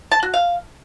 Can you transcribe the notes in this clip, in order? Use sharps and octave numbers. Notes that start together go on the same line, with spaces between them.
A5
F#4
F5